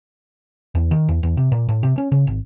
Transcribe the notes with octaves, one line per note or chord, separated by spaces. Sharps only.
E2
D#3
E2
E2
C3
A#2
A2
C3
C#4
C#3
G#1